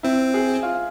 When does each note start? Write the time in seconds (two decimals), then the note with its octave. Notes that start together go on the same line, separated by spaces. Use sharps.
0.03 C4 E4
0.34 G#4
0.63 F4